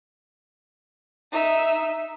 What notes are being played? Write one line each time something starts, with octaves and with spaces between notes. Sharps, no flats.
D#4 E5